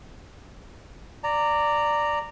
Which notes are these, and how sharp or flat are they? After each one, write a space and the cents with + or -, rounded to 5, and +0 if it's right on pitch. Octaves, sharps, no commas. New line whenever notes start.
D5 +0 A#5 -15